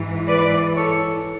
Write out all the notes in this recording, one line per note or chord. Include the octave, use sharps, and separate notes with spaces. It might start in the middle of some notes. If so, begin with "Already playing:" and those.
Already playing: G#2 E3
B4 D5
A4 C#5